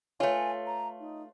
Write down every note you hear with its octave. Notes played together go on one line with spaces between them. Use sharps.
A3 F4 B4 C#5 G#5
A#5
D#4